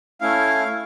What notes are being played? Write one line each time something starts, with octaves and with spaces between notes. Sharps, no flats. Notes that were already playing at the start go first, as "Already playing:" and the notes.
A3 C#4 E4 F5